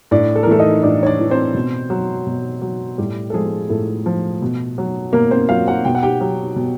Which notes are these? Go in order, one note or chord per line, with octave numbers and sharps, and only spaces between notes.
A2 D4 D5
A4
A#4
E3 A3 A4
D#4 D#5
A2 D4 D5
C#5
D4 D5
E3
C4 C5
B2
F#3
B2
F#3
A2 G3 G4
A4
F3 G#3 G#4
A2 A3 A4
F3
B2
F#3
B2 A#3 A#4
C4 C5
F#3 F4 F5
F#4 F#5
B2 G5
F#5
G4 G5
F#3
B2